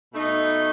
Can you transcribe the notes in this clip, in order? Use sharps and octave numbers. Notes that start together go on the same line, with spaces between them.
B2 A3 D#4